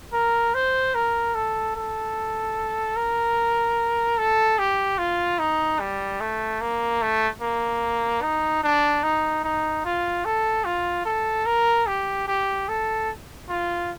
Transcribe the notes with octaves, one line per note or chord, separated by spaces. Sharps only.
A#4
C5
A#4
A4
A4
A#4
A4
G4
F4
D#4
G3
A3
A#3
A3
A#3
D#4
D4
D#4
D#4
F4
A4
F4
A4
A#4
G4
G4
A4
F4